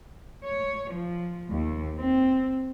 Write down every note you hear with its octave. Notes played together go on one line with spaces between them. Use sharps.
C#5
F3
D#2
C4